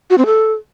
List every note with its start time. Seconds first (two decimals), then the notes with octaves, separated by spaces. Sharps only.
0.10 F#4
0.18 C4
0.26 A4